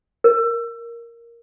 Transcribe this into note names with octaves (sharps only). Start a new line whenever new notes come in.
A#4